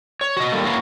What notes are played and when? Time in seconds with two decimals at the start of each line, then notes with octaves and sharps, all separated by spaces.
0.21 C#5
0.37 F#4 D#5
0.52 D3 G3 A#3 A4
0.65 A#3 E4 F#4 B4 C#5 F5